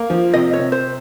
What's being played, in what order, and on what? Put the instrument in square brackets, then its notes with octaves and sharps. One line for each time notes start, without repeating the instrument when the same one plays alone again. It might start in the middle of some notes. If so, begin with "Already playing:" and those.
Already playing: [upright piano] A#3
F3
[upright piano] C3 [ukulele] D#5
[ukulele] C#5
[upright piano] C3
[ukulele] C5